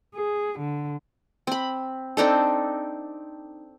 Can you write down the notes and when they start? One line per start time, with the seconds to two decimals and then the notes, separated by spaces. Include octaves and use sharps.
0.15 G#4
0.59 D3
1.47 C4 B5
2.17 C4 D4 D#4 A4